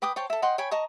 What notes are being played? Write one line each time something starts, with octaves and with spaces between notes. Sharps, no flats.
B4 G5 D6 D#6
C5 C#5 G5 A5
A4 E5
D#5 F#5 G5 C6
C#5 G5 G#5 B5
D#5 A5 A#5 C#6